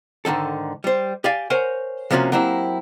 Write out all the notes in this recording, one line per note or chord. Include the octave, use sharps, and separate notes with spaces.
G#2 D3 D#3 A4
G3 C5
G4 D5 F5 G#5
A#4 C5 C#5 F#5 G#5
C3 F3 A#3 B3 C#4 F#4
F#3 A#3 C4 E4 G4